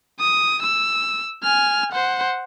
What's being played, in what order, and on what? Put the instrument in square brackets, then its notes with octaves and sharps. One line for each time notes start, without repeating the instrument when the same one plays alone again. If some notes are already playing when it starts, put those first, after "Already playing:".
[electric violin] D#6
E6
G#5 F6
C5 F#5